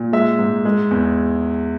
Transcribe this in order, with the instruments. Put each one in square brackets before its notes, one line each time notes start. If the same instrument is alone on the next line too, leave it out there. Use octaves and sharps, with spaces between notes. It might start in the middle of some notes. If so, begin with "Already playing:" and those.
Already playing: [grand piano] A#2
G#3 E5
G#2
G#3
E2